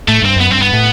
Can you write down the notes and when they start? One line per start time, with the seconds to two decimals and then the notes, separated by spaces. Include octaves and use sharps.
0.08 A2 A3
0.22 G2 C4
0.36 F#2 B3
0.50 G2 C4
0.62 B3
0.73 A2